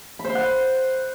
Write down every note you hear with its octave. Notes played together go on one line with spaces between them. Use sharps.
B5
C5
C6
F#5